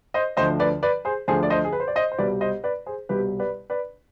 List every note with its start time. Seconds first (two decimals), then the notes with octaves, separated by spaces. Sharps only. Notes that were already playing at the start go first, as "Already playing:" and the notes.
0.14 C5 D#5
0.37 D2 D3 F3 C5 D#5
0.60 B4 D5
0.83 B4 D5
1.05 G#4 C5
1.28 D2 D3 F3 G#4 C5
1.43 D5
1.50 C5 D#5
1.65 G#4
1.73 B4
1.80 C5
1.88 D5
1.96 C5 D#5
2.12 C5
2.18 C2 B2 G3 B4 D5
2.41 C5 D#5
2.64 B4 D5
2.86 G#4 C5
3.09 C2 B2 G3 G4 B4
3.40 B4 D5
3.70 B4 D5